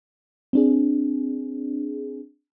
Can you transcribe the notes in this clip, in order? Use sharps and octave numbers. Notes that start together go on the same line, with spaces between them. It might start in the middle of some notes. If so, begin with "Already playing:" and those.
C4 D4 G#4